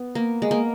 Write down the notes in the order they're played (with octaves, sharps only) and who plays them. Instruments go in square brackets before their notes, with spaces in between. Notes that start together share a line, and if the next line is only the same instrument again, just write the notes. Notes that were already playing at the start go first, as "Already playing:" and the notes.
Already playing: [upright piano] B3
[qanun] A#3
G#3
A#3